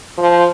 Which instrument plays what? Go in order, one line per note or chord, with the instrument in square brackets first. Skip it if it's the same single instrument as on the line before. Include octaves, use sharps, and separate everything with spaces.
[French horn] F3